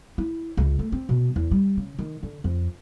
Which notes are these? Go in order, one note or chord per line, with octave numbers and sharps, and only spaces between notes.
E4
C#2
A3
C4
B2
E2
G3
C#3
D#3
D3
F2